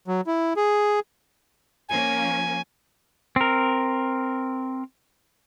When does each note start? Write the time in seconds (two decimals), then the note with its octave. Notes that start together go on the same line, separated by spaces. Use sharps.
0.08 F#3
0.27 E4
0.56 G#4
1.89 F3 A#3 C#4 G#5
3.36 C4 A#4